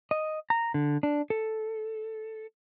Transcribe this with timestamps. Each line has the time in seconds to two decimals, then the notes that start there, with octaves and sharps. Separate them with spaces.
0.11 D#5
0.50 A#5
0.74 D3
1.03 D4
1.30 A4